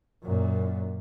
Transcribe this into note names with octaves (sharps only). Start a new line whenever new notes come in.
F#2 A#2